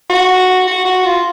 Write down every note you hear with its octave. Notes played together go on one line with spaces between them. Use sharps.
F#4
F#4
F#4
F4